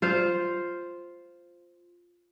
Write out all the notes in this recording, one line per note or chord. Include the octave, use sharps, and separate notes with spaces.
F4 C5 F5